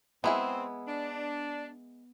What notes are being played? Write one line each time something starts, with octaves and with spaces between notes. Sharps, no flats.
G#3 B3 C4 E4 G#4
D4